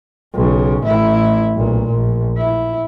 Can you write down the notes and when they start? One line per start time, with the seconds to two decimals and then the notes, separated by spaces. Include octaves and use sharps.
0.34 B1 C#3
0.83 A1 E4
1.54 B1 A#2
1.90 A#1
2.38 E4